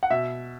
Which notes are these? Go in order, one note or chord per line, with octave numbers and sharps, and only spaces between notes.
F#5
B2 E5